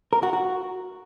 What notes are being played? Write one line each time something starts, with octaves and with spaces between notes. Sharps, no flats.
A#4
F#4
F#4